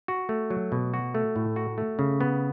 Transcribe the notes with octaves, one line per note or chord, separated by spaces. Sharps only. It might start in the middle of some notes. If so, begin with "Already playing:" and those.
F#4
A3
F#3
B2
F#4
A3
A2
F#4
A3
C#3
B3